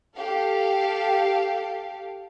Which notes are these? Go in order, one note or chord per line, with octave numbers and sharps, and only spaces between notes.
G4 A4 F5